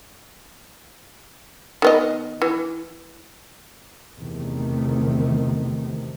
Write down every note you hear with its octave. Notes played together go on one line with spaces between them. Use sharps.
D#3 B3 D#5
E3
E2 C3 D#3 A3